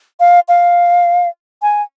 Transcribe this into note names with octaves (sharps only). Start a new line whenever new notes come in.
F5
F5
G#5